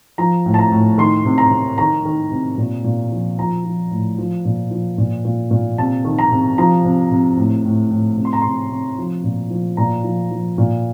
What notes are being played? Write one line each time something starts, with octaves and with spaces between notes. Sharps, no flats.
F3 A#5
A2
A5
A#5
A2
D#3 C6
C3
A#5
C3
D#3 A#5
D#3
C3
A#2
A#2
F3
F3 A#5
F3
A2
F3
A#2
F3
A#2
A#2
A#2
C3 A5
D#3
A#5
C3
F3 A#5
C3
C3
A2
A2
A2
C3
C6
A#5
C3 C6
C3
F3
A#2
F3
A#2 A#5
F3
F3
A#2